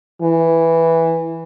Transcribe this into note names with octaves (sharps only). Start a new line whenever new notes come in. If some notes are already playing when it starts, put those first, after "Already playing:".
E3